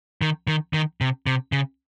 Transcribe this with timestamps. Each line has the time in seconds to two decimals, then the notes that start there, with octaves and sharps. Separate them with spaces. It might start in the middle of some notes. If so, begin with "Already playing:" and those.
0.21 D#3
0.47 D#3
0.73 D#3
1.01 C3
1.27 C3
1.52 C#3